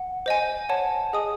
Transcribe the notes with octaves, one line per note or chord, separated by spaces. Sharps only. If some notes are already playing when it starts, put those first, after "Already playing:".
Already playing: F#5
C5 D#5 G#5
C#5 F#5 A5
G#4 D#5 G#5 D#6